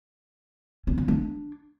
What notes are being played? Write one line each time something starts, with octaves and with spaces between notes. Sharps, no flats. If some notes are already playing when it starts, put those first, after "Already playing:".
C#4
C#4
D4